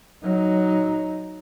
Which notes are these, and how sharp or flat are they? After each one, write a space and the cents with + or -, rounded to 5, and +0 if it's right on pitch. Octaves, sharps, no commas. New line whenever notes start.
F#3 +0 D#4 +0